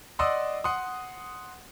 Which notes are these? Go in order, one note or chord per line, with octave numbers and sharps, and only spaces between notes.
D5 D#5 F#5 C6 D#6 E6
F#5 C6 D#6